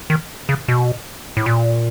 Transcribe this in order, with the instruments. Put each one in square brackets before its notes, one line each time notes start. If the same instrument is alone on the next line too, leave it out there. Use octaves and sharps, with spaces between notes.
[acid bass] D#3
C#3
B2
A2
A#2